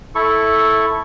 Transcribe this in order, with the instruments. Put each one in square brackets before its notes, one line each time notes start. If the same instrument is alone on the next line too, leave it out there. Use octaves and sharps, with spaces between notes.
[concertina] E4 A4 C#6